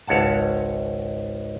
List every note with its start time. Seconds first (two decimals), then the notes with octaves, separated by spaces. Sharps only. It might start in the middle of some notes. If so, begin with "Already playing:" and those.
0.07 G#1 C#2 C#5 F#5 A5